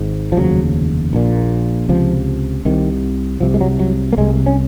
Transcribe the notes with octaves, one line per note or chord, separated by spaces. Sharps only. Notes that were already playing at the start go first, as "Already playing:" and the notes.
Already playing: G#1 G#2
F3
F1 D#2 C#3 F#3
A#1 A#2
C#2 C3 F3
C2 C3 D#3
C2 C3 F3
G#3
F#3
F#3
A#3
C2 C3 G#3
C#4